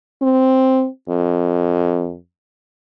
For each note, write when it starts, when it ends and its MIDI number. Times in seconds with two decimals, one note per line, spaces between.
0.22 0.87 60
1.09 2.15 41